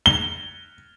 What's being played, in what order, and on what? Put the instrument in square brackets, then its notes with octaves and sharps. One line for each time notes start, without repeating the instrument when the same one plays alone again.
[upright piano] G7